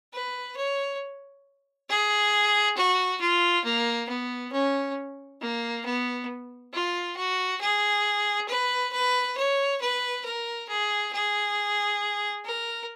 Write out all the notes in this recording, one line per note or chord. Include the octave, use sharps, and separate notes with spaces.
B4
C#5
G#4
F#4
F4
A#3
B3
C#4
A#3
B3
F4
F#4
G#4
B4
B4
C#5
B4
A#4
G#4
G#4
A#4